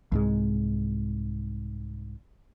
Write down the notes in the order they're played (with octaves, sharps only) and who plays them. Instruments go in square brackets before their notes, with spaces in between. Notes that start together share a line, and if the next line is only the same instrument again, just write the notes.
[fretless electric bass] C2 G#2 G#3